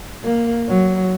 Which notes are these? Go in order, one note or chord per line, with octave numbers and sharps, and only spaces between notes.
A#3
F#3